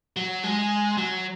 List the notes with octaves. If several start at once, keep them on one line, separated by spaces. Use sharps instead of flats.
F#3
G#3
F#3